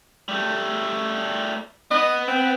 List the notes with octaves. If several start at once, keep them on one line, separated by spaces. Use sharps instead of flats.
G3 A3
B3 D#5
C4